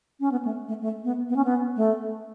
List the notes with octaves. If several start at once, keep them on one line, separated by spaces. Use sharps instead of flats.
C#4
B3
A3
A3
A3
B3
B3
C#4
B3
A3